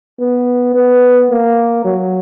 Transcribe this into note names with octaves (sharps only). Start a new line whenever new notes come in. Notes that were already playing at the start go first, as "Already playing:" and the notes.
B3
B3
A#3
F#3